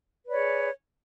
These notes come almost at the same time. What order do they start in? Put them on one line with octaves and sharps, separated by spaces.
B4 D5 C#5 G#4